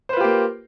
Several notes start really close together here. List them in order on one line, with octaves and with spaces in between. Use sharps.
C5 B4 F4 G4 A#3